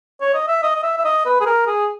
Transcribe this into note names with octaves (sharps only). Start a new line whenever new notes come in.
C#5
D#5
E5
D#5
D#5
E5
E5
D#5
B4
G#4
A#4
G#4